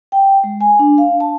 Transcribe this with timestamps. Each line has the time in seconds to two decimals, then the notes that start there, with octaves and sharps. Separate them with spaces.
0.12 G5
0.44 G#3
0.61 G#5
0.79 D4
0.98 F5
1.20 A5